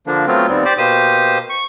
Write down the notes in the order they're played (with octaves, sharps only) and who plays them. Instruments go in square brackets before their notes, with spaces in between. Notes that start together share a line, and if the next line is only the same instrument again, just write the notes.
[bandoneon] D3 F3 A#3 D4
F#3 A3 B3 C4 F4
D#2 G3 B3 C4
G4 C5 D5
B2 A#3 G4 C5 D#6
C#6